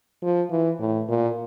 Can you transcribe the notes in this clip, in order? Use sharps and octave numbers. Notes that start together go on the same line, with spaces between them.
F3
E3
A2
A#2